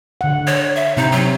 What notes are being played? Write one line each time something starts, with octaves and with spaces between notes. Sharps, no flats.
D3 F#5
C#5
E5
C3 C4 D#4
F#3